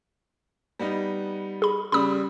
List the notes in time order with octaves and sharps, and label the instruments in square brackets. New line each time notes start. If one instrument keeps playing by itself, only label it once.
[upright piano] G3 B3 D#4
[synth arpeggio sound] G#4 B5
[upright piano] C#3 G3 [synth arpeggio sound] B5 D#6